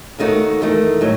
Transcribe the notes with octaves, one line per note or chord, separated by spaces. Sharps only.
D#2 D#3 A3 D#4 F#4
E2 D#3 A3
A2 F#3